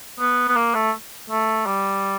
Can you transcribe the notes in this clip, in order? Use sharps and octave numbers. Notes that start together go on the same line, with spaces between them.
B3
B3
A#3
A3
A3
G3